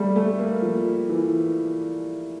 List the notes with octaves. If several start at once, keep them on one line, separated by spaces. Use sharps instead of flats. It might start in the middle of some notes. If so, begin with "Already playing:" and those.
Already playing: G3 A3
A3
A#3
F3
E3